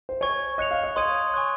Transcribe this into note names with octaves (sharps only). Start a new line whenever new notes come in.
C5
C#5 G#5 C#6 G#6
D#5 F#6 C#7 F7
F5
D#5
C#5 C6 D#6 G#6 D#7
G#5 C#6 F#6